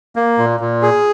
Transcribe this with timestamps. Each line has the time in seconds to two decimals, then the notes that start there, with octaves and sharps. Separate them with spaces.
0.16 A#3
0.38 A#2
0.60 A#2
0.82 G#4